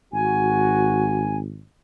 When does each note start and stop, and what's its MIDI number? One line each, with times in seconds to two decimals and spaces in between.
0.13 1.62 32
0.13 1.31 66
0.13 1.37 80